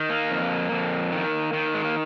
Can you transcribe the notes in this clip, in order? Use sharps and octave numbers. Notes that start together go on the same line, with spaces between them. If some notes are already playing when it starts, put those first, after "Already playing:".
Already playing: D#3
A#3
F2
F2
D#3
D#3
G#3
A#3